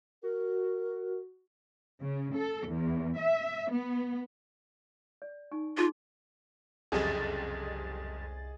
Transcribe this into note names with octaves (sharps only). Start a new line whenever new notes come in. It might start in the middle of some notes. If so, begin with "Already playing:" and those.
F#4 A#4
C#3
A4
E2
E5
B3
D5
D#4 G#5 C#6
D#4 F4 G#4 C6
F#1 C2 F2 G3 G#4 D#5 A6